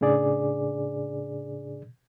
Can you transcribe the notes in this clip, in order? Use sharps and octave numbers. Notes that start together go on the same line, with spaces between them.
A2 C#3 D4 G#4 D5